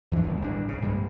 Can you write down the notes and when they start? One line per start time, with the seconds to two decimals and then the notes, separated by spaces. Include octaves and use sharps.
0.11 E2 E3 A#3 D4
0.24 D#1 C#2
0.42 G1 A2 D4
0.68 C2 C#3
0.82 A#1 G2 G3 G#3